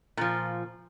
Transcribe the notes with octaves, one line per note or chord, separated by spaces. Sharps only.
A#2 F3